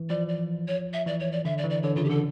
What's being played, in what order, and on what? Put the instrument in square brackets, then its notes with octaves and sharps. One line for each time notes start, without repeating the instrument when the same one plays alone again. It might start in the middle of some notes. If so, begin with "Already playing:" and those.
Already playing: [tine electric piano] E3
[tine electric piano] F3 [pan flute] D5
[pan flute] D5
C#5
E5
[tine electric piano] E3 [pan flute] D5
[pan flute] C#5
D5
[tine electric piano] D3 [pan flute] E5
[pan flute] D5
[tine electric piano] E3
[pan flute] D5
[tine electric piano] D3 [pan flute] C#5
[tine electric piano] C#3 [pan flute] F4
[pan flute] G4
[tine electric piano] D3 [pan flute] A4